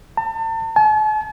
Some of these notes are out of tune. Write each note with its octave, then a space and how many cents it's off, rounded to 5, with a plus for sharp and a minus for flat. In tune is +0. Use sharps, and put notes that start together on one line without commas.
A5 +40
A5 -45